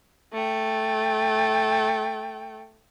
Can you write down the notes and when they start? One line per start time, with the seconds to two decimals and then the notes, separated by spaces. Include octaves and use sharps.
0.33 A3 G5